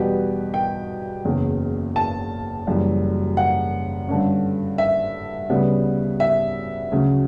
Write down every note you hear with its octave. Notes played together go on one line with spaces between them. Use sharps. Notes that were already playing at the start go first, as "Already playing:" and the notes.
Already playing: E2 B2 G3 B3 G4
G5
F#1 E2 C#3
A5
F#1 F#2 E3 G3
F#5
G2 D3 A3 C#4
E5
D2 C#3 G3 B3
E5
D2 C#3 F#3 C#4